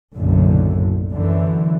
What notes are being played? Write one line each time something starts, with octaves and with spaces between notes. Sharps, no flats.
F#1 B1 F#2 A2 D3
F#2 D3 E3